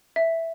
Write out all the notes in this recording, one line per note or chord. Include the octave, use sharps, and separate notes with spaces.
E5